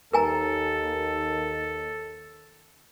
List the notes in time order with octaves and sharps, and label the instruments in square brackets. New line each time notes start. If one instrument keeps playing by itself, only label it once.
[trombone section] D#2 D#3 [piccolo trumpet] A4 [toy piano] A#4 G#5 A#5